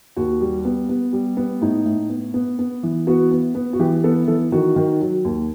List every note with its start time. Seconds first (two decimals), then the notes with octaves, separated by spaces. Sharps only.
0.17 D#2 F#4
0.41 G3
0.65 B3
0.89 B3
1.13 G3
1.37 B3
1.61 A2 D#4
1.86 A2
2.09 B3
2.34 B3
2.59 B3
2.83 E3
3.07 B3 F#4
3.31 B3
3.55 B3
3.73 F#4
3.79 E3 G4
4.04 B3 A4
4.27 E3 A4
4.52 D#3 F#4
4.76 D#3
5.01 F#3
5.25 D#2